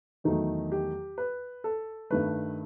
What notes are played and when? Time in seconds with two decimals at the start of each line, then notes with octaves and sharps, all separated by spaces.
0.24 E2 D#3 F#3 A3 D#4
0.72 G4
1.18 B4
1.64 A4
2.10 G2 D#3 A3 B4